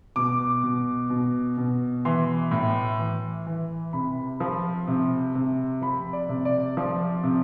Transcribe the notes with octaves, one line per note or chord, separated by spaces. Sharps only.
B2 D6
B2
B2
B2
E3 C6
A2
E3
E3
C3 B5
F3
C3
C3
F3 B5
D5
C3
D5
F3
C3